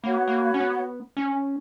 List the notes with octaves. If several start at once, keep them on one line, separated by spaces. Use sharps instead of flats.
A#3 F#4 C#5 F#5 B5
B3
A#3
C#4
B3
C#4